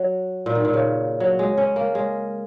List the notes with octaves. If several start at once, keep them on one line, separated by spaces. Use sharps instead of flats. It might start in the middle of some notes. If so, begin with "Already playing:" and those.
Already playing: F#3
A#2
D#3
A#2
C#3
F#3
G#3
C#4
A#3
G#3